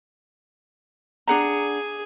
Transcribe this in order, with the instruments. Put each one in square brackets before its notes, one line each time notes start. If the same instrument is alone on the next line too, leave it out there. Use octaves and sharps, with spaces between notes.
[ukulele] D4 F#5 A#5 [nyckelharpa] G#4